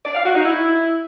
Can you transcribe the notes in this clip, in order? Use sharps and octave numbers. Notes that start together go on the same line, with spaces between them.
D5
F5
F#4
D#4
E4